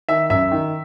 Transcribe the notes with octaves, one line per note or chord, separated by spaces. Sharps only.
D#3 E5
F#2 E5
D#3